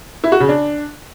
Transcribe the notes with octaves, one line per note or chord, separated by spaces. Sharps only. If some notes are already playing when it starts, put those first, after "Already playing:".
E4
F#4
C#3
D4